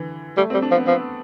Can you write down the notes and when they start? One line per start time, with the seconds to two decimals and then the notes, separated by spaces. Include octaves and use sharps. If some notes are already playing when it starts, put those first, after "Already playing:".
Already playing: D3 E3
0.37 G3 A3
0.50 G3 C4
0.62 D4
0.71 F3
0.75 B3
0.87 F3 B3